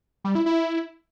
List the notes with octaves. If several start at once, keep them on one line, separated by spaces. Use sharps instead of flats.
G3
E4
E4